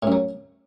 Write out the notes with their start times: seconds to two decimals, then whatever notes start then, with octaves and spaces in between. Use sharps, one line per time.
0.03 A2
0.07 F#2
0.12 F#3